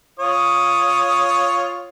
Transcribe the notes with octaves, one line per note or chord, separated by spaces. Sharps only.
F4 C#5 D#6